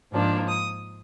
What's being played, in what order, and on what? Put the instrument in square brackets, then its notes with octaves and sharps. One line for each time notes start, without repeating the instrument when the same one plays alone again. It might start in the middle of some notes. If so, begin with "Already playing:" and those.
[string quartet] G#2 F3 A#3 D4
D#6